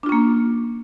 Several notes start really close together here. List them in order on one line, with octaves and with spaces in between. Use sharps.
D4 F4 C#4 A#3